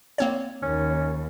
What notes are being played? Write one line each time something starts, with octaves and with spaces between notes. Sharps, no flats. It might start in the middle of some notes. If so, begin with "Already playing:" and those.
A#3 C4 C#5
D#2 C#4